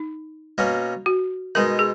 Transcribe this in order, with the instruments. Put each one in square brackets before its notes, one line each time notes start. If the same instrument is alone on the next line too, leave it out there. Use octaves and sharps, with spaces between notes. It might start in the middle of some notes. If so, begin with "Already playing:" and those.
Already playing: [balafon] D#4
[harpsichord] B2 A#3 C#4
[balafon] F#4
[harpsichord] B2 G#3 D#4 [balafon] A#4
[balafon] G#4